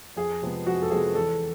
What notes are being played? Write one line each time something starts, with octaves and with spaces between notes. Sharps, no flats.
F2 G#4
C3 F3 G#3 B3
F2 F#4
A4
C3 F3 G#3 B3 G#4
E2 A4